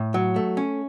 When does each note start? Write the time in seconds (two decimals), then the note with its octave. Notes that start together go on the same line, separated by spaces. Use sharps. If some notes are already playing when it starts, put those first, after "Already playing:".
Already playing: A2
0.14 F#3
0.36 A3
0.57 C#4